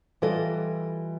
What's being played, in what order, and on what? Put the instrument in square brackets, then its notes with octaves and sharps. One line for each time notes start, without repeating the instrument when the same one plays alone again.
[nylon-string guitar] E3 G3 F4 A4 D#5